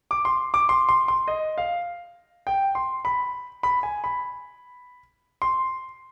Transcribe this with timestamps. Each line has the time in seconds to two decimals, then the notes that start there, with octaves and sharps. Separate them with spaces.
0.11 D6
0.25 C6
0.54 D6
0.69 C6
0.89 C6
1.08 C6
1.28 D#5
1.58 F5
2.47 G5
2.75 C6
3.05 B5
3.63 B5
3.83 G#5
4.04 B5
5.42 C6